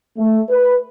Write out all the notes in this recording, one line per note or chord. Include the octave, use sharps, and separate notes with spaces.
A3
B4